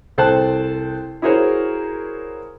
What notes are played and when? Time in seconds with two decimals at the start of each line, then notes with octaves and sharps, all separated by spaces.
0.18 C2 A4 C5 G5 A5 F#6
1.22 E4 F#4 G#4 A#4 C5 C#5